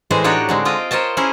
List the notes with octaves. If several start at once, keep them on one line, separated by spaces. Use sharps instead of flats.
A2 E3 G#3 G#4 C5
D4 D#4 F#4 G4 C#5
D3 G#3 C4
C4 F4 D#5 G5
A#4 C5 C#5 D#5 A5
C#4 E4 G#4 A#4 C5